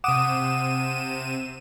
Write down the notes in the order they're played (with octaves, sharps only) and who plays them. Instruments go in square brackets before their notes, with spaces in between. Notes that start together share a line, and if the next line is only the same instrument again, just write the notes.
[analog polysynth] C3 D#7 E7 [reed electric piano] F#5 D6 D#6